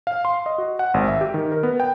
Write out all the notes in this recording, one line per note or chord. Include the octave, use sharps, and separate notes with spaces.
F5
C6
D#5
F#4
F#5
G#1
E5
G4
D#3
A#4
B3
G5